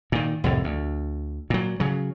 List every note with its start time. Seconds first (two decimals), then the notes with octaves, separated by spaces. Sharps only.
0.12 A#2 D#3
0.44 C2 F2 A2
0.64 D2
1.50 A#2 F#3
1.80 C#3 F#3